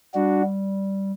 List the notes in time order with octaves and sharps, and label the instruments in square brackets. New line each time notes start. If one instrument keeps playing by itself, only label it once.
[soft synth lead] G3 [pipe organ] D4 F#4